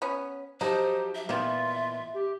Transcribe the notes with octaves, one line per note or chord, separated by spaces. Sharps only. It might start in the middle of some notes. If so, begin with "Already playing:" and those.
B3 C#4
F3 F#3 D#4 G4 C5 A5
E5
A#2 D#3 E3 A#3 B3 F4 E5
G4